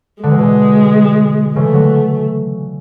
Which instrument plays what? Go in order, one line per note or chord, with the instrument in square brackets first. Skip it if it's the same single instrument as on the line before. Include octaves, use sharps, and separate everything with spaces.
[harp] D3 [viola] G#3
[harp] E3
B2 D3
[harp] C#3 E3 [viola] A3
[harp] D3 F#3